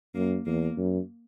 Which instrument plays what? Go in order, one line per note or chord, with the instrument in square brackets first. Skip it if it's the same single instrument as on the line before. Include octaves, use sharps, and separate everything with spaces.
[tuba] F#2 [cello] A#3
[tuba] E2 [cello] A#3
[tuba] F#2